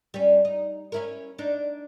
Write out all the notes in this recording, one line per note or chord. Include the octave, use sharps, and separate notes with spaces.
G3 C#4
D#4
C#4 E4 A#4
D4 D#4